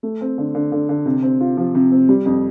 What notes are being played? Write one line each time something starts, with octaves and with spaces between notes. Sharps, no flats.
A3
C4
D3
D3
D3
D3
C3
C4
F4
F3
C3
C4
G3
F2